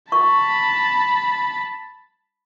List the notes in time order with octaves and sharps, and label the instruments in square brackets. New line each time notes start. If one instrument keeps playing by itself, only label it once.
[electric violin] A5 B5 [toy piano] C#6